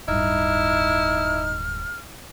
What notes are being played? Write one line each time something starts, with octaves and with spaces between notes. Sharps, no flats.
D1 G2 D#4 E4 F6